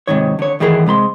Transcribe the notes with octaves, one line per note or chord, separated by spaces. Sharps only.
G#2 C3 D#3 C#5
D3 C#5
A2 D#3 E3 A3 G#4 A#4
C3 G#3 B5 C6